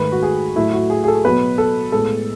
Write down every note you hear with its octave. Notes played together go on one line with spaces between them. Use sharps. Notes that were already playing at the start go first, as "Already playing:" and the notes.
Already playing: G#2 D#3 A3 B4
F#4
G#4
A2 F#3 A3 E4
F#4
G#4
G#4
A4
B2 F#3 B3 B4
A4
A2 G#3 B3 A4